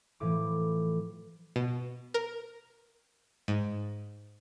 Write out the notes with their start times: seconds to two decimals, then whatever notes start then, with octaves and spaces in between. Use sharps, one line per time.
0.20 A2 E3 F3 D6
1.56 B2
2.14 A#4
3.48 G#2